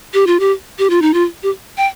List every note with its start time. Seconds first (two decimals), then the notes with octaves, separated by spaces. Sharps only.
0.14 G4
0.27 F4
0.40 G4
0.79 G4
0.90 F4
1.02 D#4
1.14 F4
1.43 G4
1.77 G5